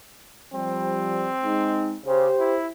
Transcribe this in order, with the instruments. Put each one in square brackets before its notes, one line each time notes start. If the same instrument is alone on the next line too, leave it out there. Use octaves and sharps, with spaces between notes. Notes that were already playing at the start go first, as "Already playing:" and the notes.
[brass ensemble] F3 G3 [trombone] C4
[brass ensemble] G#3 D#4
[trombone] C#3 [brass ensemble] G4 C5
[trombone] E4